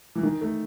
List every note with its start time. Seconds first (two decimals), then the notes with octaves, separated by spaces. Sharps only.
0.15 E3
0.23 D#3
0.41 A3